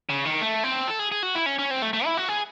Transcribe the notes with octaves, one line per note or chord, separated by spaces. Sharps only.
C#3
D#3
A3
C4
A4
G#4
G#4
F#4
E4
C#4
C#4
C4
A3
A3
E4
F#4
G#4